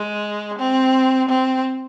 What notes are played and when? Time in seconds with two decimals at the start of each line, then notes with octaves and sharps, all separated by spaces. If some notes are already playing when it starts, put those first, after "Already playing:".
Already playing: G#3
0.59 C4
1.29 C4